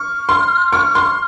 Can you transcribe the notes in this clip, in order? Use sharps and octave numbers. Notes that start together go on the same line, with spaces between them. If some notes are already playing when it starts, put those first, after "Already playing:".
Already playing: C#6 F6
C6
C#6
C6